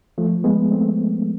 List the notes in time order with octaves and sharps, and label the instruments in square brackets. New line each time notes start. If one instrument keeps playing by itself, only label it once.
[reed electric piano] F3 A3
G#3 B3
A3 C4